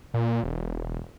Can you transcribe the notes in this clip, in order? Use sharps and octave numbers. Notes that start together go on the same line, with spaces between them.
A#2
E1